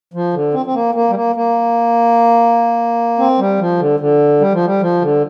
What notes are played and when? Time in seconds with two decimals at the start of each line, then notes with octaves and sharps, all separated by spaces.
0.14 F3
0.34 D3
0.54 C4
0.66 C4
0.74 A#3
0.95 A#3
1.10 G3
1.15 A#3
1.36 A#3
3.19 C4
3.39 G3
3.59 F3
3.79 D3
4.00 D3
4.40 G3
4.53 F3
4.65 G3
4.82 F3
5.01 D3